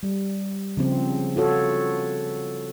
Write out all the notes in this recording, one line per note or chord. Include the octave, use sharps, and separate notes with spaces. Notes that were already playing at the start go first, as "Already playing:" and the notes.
G3
C#3 F3 C4
F4 F#4 A4 C#5